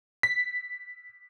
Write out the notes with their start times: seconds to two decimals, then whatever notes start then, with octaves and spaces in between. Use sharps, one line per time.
0.23 B6